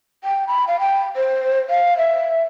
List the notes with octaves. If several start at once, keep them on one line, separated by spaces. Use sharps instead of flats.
G5
B5
F5
G5
C5
F5
E5